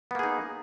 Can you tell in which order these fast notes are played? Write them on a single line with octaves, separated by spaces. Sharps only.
B3 A#3 G#4 D#4